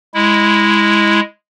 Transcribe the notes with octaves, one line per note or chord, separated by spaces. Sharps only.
G#3 E4